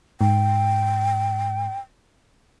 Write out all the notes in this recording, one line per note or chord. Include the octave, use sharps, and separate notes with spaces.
G#2 G5